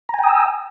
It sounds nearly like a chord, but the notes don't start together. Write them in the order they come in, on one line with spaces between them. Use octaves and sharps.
A#5 G#5 G5 D#6 E6